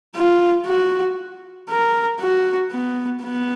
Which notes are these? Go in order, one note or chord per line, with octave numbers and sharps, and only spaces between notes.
F4
F#4
A#4
F#4
B3
B3